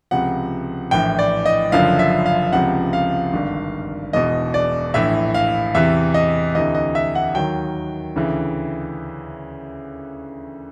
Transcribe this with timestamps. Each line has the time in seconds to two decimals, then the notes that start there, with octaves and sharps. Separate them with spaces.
0.11 C#2 C3 F3 F#5
0.91 A#1 A2 E3 G5
1.19 D5
1.46 D#5
1.72 F#1 F#2 D3 F3 F5
1.99 E5
2.26 F5
2.52 C#2 C3 F3 F#5
2.93 F5
3.33 G#1 G2 D3
4.13 E1 E2 B2 D#5
4.54 D5
4.94 A#1 A2 E3 E5
5.34 F5
5.74 E2 C3 E3 E5
6.14 D#5
6.55 D2 C3 E3 D#5
6.75 D#5
6.95 E5
7.15 F#5
7.35 D#2 D#3 F#3 G5
8.16 D2 C#3 E3